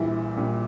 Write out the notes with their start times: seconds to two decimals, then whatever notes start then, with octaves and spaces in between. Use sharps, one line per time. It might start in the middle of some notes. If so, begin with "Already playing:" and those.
Already playing: A#1 A#2 E3 G3 E4
0.36 A#1 A#2 G3